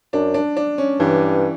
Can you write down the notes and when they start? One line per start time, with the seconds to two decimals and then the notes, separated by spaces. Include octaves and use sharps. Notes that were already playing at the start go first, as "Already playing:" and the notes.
0.13 F#2 D4
0.34 D4
0.57 D4
0.78 C#4
1.00 G2 E3